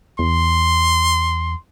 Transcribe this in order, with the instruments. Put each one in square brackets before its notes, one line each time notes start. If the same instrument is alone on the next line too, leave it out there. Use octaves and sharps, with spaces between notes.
[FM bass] E2 [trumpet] C6